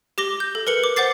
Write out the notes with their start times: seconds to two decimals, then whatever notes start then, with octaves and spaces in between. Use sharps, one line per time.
0.18 G4 D6 A#6 G7
0.40 G6
0.55 A4
0.67 A#4 B4 C#7 F#7
0.84 D6
0.96 C5 F#5 D6 A6 C7